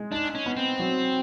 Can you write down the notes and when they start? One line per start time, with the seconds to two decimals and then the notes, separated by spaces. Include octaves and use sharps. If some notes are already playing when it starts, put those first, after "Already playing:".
Already playing: G#3
0.11 D4 D#4
0.35 C#4
0.46 B3
0.57 C4
0.79 F#3